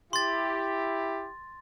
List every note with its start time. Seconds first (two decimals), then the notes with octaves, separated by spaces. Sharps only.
0.13 E4 G4 C6 A6